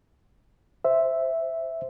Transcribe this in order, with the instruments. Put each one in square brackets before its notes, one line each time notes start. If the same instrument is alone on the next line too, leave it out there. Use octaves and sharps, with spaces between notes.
[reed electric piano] C5 E5